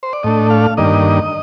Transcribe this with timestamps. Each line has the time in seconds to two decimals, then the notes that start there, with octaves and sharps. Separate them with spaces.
0.03 C5
0.13 D5
0.23 A2 A3 D4 D#5
0.50 F5
0.77 G2 D#3 A#3 D4 D#5